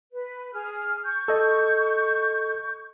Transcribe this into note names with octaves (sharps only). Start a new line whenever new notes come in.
B4
G#4 F6
C#6 G6
A4 D#5